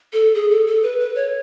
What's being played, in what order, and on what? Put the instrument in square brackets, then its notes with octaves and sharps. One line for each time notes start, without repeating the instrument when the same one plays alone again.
[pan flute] A4
G#4
A4
A4
B4
B4
C#5